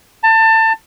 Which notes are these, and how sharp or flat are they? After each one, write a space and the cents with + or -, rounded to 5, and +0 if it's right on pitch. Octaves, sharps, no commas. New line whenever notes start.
A5 +25